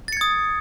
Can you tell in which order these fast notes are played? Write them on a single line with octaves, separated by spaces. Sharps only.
A6 C#7 G#6 D#6